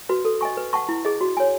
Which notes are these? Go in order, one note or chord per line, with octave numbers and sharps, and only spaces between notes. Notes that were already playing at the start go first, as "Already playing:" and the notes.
F#4 B4
A4
D#5 G#5 C#6
B4
F#5 A5 C#6
E4
G#4 D#5
F#4
C#5 G#5